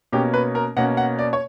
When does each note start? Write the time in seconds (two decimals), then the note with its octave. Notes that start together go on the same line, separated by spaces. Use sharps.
0.12 B2 A#3 C#4 G4
0.34 B4
0.55 A#4
0.76 B2 A#3 C#4 F#5
0.97 F#5
1.19 D5
1.33 C#5